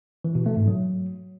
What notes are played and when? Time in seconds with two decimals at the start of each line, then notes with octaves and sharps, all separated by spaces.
0.24 E3
0.35 B2
0.46 A3
0.57 G#2
0.68 F#3